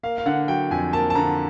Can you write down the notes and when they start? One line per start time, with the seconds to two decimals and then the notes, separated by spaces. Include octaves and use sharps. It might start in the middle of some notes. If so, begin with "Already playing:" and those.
0.03 A#3 F5
0.18 F5
0.26 D3 F#5
0.48 F#3 G5
0.71 F2 G#5
0.93 A#3 A5
1.10 A5
1.15 D3 A#5